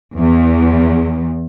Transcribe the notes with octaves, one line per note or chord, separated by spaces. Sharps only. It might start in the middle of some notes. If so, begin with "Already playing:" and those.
E2